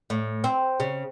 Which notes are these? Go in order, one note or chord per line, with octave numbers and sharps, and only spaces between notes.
A2
C4
C#3